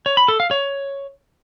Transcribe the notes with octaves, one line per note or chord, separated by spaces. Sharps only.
C#5
B5
A4
F5
C#5